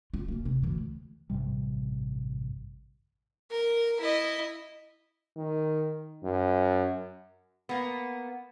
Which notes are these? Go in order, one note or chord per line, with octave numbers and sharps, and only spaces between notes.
F4
F#2 A#3
C3
D2 E3
A1 G2 C3 G3
A#4
E4 D#5
D#3
F#2
A#3 B3